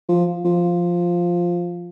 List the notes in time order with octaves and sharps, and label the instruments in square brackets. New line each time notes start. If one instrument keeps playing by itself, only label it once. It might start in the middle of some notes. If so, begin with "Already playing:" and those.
[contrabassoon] F3
F3